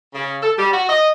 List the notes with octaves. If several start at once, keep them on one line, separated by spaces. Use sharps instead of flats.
C#3
A4
G3
F#4
D#5